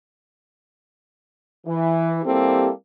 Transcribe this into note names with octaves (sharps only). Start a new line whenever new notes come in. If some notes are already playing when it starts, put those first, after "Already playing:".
E3
G3 A#3 C4 E4 G4 A4